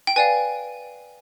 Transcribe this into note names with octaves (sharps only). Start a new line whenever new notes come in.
G5
B4 D5 F5 G#5